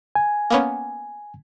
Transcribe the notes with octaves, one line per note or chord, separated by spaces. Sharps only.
G#5
A#3 B3 C#4